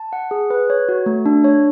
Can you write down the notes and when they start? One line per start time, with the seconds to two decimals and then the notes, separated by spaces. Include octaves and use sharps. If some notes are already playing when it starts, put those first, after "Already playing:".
Already playing: A5
0.13 F#5
0.31 G#4
0.50 B4
0.70 C#5
0.89 F#4
1.06 A3
1.26 D4
1.44 C#5